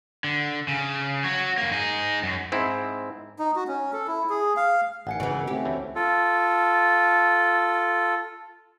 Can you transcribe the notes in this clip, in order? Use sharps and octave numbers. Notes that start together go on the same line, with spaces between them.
D3
C#3
F#4 C#5
F#2 A#3
D#4 G#4
F#2
G#2 C4 E4
D#4
F#4
C#4
A4
E4
G#4
F5
A1 D#3 F#5 G#5 C#7
G#1 G#2 C#3 E3
B2 D#3
A3 C4 C#4 G4
D2 E3
F4 A4